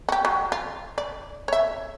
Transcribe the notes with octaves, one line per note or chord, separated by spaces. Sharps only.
F#4 G4
F#3
F4
D5
C#5 E5